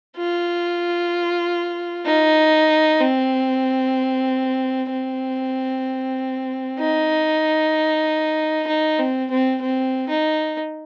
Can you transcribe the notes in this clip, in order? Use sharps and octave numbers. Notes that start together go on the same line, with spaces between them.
F4
D#4
C4
C4
D#4
D#4
C4
C4
C4
D#4